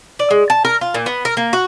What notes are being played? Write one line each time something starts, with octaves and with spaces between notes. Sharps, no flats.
D5
G#3
A5
A#4
F4
A#2
B3
A#4
A#3
F#4